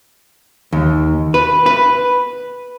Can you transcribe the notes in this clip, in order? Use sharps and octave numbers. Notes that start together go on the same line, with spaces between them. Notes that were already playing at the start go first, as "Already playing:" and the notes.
D#2
B4
B4